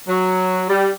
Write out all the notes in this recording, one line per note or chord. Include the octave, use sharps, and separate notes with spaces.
F#3
G3